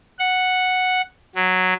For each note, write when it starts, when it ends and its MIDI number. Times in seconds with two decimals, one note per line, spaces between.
0.19 1.01 78
1.35 1.74 54